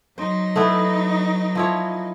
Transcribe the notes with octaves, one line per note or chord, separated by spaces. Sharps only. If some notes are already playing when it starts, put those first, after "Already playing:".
F#3 D#4 C5
A3 B3 E4
F3 E4 C#5